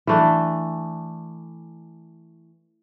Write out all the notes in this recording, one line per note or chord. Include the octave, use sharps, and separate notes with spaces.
E3 A3 D4